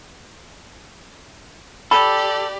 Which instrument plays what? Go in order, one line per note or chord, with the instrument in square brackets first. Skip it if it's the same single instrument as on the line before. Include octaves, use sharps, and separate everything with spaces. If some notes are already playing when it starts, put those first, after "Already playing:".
[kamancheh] G4 D5 [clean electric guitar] A4 [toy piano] B5